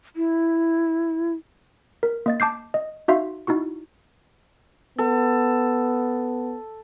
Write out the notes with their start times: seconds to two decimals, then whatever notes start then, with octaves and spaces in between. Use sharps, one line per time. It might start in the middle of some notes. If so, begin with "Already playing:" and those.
0.16 E4
2.03 A#4
2.26 A#3 D#5 A6
2.40 A5 D6 G6 C7
2.74 D#5
3.08 D#4 F#4 E5 F5 C6
3.47 D#4 E4 F#4 C#6
4.98 B3 A4